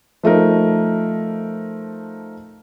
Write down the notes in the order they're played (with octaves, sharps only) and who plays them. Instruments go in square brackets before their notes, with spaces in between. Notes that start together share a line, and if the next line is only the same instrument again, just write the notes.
[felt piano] F3 A3 D#4 A#4